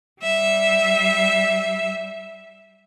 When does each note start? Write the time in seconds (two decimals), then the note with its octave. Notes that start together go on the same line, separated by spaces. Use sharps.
0.22 G3 E5